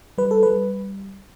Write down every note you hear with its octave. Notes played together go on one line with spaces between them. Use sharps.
G3 B4
A4
G3 B4